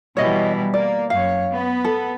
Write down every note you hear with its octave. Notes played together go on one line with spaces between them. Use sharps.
B2 E3 G3 C#5 D#5
A#3 D5
F#2 C#5 F5
B3
A4